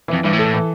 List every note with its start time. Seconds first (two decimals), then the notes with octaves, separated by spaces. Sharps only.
0.08 E3
0.13 F2
0.24 G2 E3
0.34 A2
0.39 A4
0.54 E3